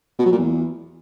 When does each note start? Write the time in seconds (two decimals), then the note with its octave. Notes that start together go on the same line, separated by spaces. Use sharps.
0.19 B2
0.25 F#3
0.32 A#2
0.38 E2